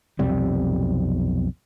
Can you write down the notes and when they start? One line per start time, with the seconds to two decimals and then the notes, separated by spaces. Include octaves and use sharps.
0.19 B1 F2 C3 G3